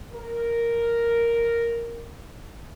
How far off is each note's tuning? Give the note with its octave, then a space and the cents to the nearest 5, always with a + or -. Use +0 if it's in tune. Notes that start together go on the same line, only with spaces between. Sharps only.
A#4 +0